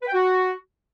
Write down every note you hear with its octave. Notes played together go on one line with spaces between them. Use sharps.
B4
G5
F#4